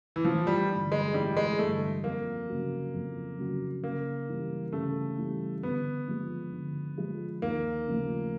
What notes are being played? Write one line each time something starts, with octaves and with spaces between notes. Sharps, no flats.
E3
A1 F3
G3
G2 D3
G#3
A1 G3
G#3
G2 D3 A3
F2 A#3
C#3 F#3
F2
C#3 F#3
C#3 A#3
E3 G3
C#3 A3
E3 G3
D3 B3
F3 G#3
D3
F3 G#3
D#2 A#3
C#3 F3 A3